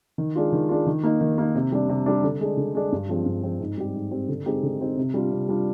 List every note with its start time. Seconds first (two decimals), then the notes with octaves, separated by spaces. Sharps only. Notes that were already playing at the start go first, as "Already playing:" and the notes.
0.18 D#3
0.35 G#3 D4 F4
0.53 D#3
0.69 G#3 D4 F4
0.86 D#3
1.03 A#3 D#4
1.21 D#3
1.38 A#3 D#4
1.55 C3
1.72 G3 D4
1.89 C3
2.06 G3 D4
2.24 D3
2.41 G#3 D4
2.57 D3
2.75 G#3 D4
2.92 G2
3.09 F3 G#3 C4
3.26 G2
3.43 F3 G#3 C4
3.60 G#2
3.78 G3 C4 G4
3.94 G#2
4.11 G3 C4 G4
4.29 D3
4.46 G#3 C4 D#4 G4
4.63 D3
4.80 G#3 C4 D#4 G4
4.97 C3
5.14 G3 D4 F4
5.32 C3
5.49 G3 D4 F4